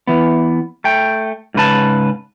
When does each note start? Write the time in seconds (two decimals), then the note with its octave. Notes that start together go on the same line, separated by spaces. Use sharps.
0.07 E3 B3
0.84 A3 G5
1.54 G#2 C#3 B4 A5